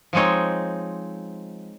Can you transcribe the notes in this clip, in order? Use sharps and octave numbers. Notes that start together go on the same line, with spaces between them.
F3 G#3 C4 D#4 C#5